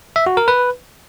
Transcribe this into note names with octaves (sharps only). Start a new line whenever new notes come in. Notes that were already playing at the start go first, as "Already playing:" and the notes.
E5
F#4
A#4
B4